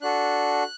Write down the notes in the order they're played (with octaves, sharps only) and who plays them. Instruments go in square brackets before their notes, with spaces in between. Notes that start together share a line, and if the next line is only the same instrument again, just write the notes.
[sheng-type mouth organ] D4 F#4 A4 F#6